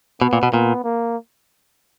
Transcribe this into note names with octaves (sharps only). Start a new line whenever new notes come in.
B2 B3
A#2
B2
A#2 B3
A#3